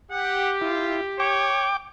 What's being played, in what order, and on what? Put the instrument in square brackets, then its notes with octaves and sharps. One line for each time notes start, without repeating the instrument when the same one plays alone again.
[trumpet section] G4 [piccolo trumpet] F#5
[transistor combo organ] E4 [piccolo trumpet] F4
[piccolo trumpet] C#5 [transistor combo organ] G5 D6